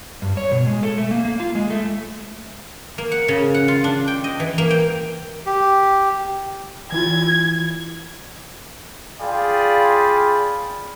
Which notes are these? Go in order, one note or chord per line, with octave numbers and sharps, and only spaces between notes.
G2
C#5
B2
G#3
A4
A3
A#3
A#3
F4
G#3
A3
A#3
F#5
C#3
F#5
F4
D4
G5
D#5
E3
A#3
G5
G4
E3 E4 F4 G#6
F4 G#4 D5 F5 G5 B5